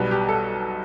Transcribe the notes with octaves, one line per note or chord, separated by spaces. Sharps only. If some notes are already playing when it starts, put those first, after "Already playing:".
Already playing: B1 B2 G3 B4
G4
A4